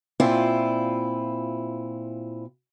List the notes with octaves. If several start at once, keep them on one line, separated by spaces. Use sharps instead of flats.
A#2 C4 E4 F4